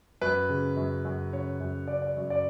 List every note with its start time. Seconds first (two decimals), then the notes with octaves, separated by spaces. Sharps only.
0.21 F#2 B4
0.49 C#3
0.77 F#2
1.05 F#2
1.33 C#3 C#5
1.60 F#2
1.88 C#3 D5
2.02 D5
2.16 F#2
2.30 D5